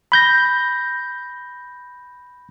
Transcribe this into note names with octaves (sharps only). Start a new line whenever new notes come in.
B5 G6 A#6